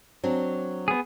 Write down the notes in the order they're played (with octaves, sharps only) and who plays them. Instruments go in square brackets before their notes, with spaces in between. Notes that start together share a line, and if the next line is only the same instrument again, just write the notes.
[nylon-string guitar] F#3 C4 D4
[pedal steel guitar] B3 G#4